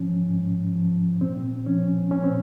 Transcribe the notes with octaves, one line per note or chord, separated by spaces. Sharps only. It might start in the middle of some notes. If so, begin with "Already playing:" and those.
Already playing: G#2 F3 C#4
G#2
F3
A#2 C4
F3 C#4
A#2 C#4
C4